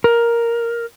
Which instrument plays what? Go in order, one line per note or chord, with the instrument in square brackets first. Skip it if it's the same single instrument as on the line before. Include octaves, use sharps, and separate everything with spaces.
[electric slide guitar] A#4